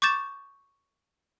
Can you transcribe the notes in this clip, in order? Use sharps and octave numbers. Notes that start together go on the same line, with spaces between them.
C#6 D6 G6 A6 E7